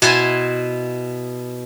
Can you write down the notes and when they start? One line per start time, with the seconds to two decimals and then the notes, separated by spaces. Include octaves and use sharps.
0.02 B2 E4 C5 G#5 C6